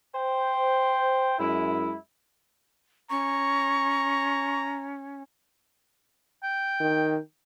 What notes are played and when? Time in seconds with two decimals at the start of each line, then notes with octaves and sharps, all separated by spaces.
0.15 C5 G5
1.38 F#2 G#3 E4
3.10 C#4 A#5 C#6
6.43 G5
6.80 D#3